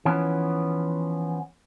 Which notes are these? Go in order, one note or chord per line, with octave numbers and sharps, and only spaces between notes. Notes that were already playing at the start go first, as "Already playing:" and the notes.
E3 F3 B3 C#4